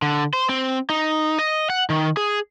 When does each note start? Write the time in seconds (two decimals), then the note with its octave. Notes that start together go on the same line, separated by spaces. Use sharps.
0.02 D3
0.33 C5
0.49 C4
0.90 D#4
1.39 D#5
1.70 F#5
1.90 D#3
2.17 G#4